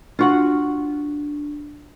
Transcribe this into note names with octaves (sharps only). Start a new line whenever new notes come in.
D4 F4 F#4 F#5